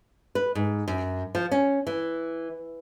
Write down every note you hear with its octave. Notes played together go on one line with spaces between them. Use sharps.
B4
G#2
F#2
F3
C#4
E3